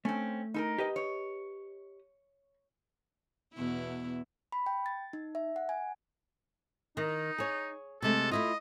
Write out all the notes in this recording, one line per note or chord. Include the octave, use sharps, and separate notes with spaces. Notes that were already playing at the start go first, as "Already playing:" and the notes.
A3 C4 C#4
D#4 A4 A#4
G4 B4 D#5
C#5
E2 B2 E4
B5
G5
A6
D#4
E5
F#5
G#5
D#3 D#4
G#4 C#5
C3 G#3 A3 A4
A3 E4 F4 D#5